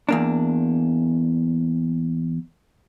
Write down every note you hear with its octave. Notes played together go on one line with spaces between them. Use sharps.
E2 A#3 D4